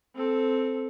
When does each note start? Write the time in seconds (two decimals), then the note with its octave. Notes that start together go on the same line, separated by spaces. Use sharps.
0.15 C4 A4